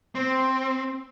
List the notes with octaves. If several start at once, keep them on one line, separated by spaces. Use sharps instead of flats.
C4